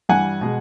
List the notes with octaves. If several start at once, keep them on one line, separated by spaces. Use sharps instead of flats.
G2 E3 G3 F#5 G#5
B2 G#3